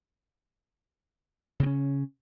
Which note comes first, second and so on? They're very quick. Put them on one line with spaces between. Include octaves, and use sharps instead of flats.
C#3 C4 C#4